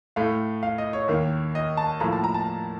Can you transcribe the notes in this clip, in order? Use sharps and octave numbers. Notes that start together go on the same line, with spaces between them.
A2 A3 F5
F5
D#5
C#5
D#2 D#3 A#3
D#5
A5
A2 F3 A#3 A#5
A5
A#5
A5